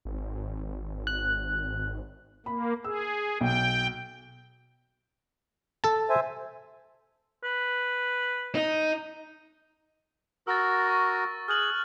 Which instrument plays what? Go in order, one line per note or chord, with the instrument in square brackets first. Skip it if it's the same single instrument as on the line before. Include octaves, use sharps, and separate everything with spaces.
[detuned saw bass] G#1
[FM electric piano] F#6
[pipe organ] A#3 [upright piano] B5
[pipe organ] G#4 [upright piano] E6
[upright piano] B1 [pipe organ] G5
[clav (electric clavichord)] A4 A5
[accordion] C5 E5 G#5
[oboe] B4
[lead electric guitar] D#4
[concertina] F#4 A#4 [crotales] E6 A6
[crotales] C#6
[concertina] G#4 [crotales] F6 F#6 F#7